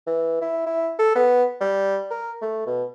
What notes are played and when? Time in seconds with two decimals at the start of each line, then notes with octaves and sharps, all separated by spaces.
0.07 E3
0.41 E4
0.66 E4
0.99 A4
1.15 B3
1.61 G3
2.11 A#4
2.42 A3
2.66 B2